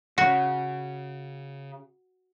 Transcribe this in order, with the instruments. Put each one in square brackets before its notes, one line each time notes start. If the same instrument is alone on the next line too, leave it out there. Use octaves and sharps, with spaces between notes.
[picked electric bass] C#3 [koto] F#4